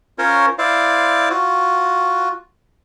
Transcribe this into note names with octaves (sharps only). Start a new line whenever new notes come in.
C#4 F4 A#4 C5 C#5
E4 C5 D5 F5
F4 F#4